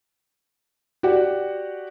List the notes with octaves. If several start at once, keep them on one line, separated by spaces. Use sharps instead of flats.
F#4 G4 D5 F#5